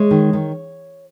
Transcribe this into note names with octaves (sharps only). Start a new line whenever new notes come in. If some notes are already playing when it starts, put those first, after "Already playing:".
Already playing: G#3 C#5
D#3
D#3